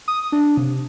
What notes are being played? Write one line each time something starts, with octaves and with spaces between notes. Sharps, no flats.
D#6
D4
C3